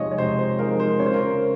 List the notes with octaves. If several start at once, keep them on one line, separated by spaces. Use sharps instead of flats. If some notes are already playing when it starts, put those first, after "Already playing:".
Already playing: C3 F3 G#3 D#4 C#5 D#5
C#5
C3 C5
C5
F3 G#3 D#4 A#4
C5
C#3 C#5
C5
A#4
C5